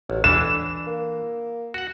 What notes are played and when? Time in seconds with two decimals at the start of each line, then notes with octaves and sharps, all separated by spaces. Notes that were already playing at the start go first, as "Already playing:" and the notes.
0.10 A1 F#3
0.24 D3 E3 D4 E7
0.87 A#3
1.74 F#4 F#5